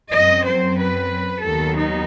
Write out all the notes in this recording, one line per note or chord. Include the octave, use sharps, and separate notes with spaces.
F#2 F#3 C4 D#5
C5
B4
D#2 D#3 F#3 B3 A4
D#4